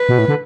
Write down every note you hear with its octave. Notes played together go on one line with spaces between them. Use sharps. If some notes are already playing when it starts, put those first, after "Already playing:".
Already playing: B4
B2
A2
D3